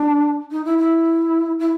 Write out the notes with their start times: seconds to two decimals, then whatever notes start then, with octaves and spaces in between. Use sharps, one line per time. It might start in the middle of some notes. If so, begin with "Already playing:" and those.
Already playing: D4
0.51 D#4
0.65 E4
0.78 E4
1.59 E4